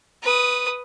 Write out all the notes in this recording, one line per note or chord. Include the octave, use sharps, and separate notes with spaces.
B4 D#6